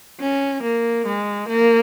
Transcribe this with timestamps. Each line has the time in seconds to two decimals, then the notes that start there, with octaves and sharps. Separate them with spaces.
0.20 C#4
0.63 A#3
1.06 G#3
1.48 A#3